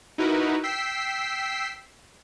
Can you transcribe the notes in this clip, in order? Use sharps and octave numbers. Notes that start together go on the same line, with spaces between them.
D#4 E4 F#4 A#4 B4
G5 E6 B6 C7